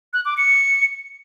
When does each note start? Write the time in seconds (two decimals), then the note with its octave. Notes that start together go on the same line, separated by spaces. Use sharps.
0.13 F#6
0.25 D6
0.37 C#7